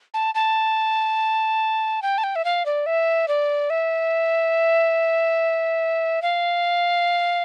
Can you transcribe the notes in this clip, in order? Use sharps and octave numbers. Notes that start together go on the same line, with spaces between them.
A5
A5
G5
A5
G5
E5
F5
D5
E5
D5
E5
F5